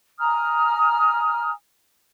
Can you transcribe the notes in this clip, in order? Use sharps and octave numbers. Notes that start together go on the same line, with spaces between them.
G#5 A#5 D#6 F6